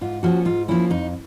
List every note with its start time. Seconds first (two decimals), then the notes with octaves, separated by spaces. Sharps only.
0.01 G#2 F4
0.23 F3 A#3 C#4 F#4
0.45 G#2 F4
0.68 F3 A#3 C#4 E4
0.90 F2 D#4